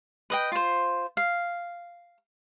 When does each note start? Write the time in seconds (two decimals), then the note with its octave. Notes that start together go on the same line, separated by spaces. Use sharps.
0.30 B4 D#5 G5
0.52 F4 C5
1.17 F5